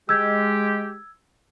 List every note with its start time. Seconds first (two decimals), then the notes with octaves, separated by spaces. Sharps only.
0.09 G#3 G4 E6 G#6